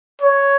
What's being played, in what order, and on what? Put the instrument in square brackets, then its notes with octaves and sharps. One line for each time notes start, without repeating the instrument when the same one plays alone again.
[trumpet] C#5